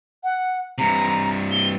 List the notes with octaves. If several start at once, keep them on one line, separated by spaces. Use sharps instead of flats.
F#5
G2 C3 A#5
G7